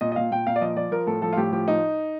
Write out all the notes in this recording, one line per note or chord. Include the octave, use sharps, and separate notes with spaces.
A#2 D#5
D#5
A#2 F5
A#2 G5
A#2 F5
D5
F3 D#5
F3 D5
F3 A#4
A2 A4
F3 A4
F4
A2 G4
F3 G4
F3 D#4